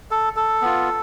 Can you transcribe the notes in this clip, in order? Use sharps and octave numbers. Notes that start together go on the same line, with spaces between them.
A4
A4
B3 F4